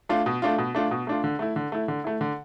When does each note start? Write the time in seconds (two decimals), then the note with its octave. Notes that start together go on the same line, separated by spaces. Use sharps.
0.09 A3 D4 F4
0.26 B2
0.42 A3 D4 F4
0.58 B2
0.75 A3 D4 F4
0.91 B2
1.07 A3 D4 F4
1.24 D3
1.39 A3 E4
1.56 D3
1.72 A3 E4
1.88 D3
2.04 A3 E4
2.21 D3